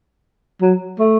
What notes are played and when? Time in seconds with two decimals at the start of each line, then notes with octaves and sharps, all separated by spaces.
0.62 F#3
0.99 A3